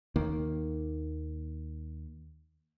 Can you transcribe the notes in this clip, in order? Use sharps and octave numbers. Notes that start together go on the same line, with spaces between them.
D#2 D#3 A#3